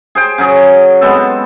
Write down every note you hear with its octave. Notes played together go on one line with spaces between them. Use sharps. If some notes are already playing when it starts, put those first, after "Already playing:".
G#4 C5 G5
C#3 F#3 G#4
G#3 B3 C4 A4